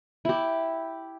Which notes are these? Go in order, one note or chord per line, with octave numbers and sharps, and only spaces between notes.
E4 G4